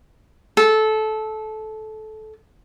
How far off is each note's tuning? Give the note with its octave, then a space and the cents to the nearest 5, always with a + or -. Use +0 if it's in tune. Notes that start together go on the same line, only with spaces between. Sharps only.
A4 -20